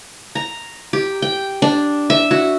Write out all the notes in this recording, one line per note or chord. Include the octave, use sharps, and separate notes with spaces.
A#5
G4
G5
D4
E5
F#4